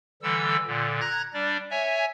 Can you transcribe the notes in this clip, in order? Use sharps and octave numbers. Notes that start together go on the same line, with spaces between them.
D3 E3 G3 A4 E6
A#2 D3
A#5 F#6 G#6 A#6
G3 D4 D5
C#5 E5 G#5